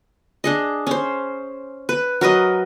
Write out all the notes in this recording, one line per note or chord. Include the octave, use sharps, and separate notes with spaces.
D4 G#4 D#5
C#4 C5
B4
F#3 A#4 B4 D#5